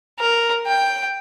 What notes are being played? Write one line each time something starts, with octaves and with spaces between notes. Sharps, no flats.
A#4
G5